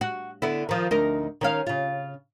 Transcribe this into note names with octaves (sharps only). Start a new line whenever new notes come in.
F#4
D3 B3 E4
D#3 F3
D2 D#4 A#4
D#3 C#4 F5
C#3 F4